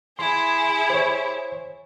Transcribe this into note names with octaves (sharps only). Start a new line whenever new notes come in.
E4 G#4 C6
C5 C#5